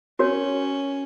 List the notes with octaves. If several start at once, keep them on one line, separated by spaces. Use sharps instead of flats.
C#4 F#4 A#4 C#5